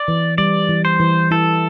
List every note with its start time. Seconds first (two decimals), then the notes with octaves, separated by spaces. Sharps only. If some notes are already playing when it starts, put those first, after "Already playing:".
Already playing: D5
0.08 E3
0.38 G3 D5
0.69 E3
0.85 C5
1.00 E3
1.31 E4 A4